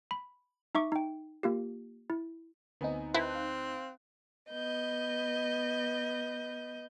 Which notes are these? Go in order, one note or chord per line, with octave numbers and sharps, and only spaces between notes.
B5
D#4 E5 C#6 D6
D#4 G5
A#3 F4 G4
E4
D2 B3 C4 D#4 G#5
C4 E4 B4 A5 F#6
F5
B3 D#5 G6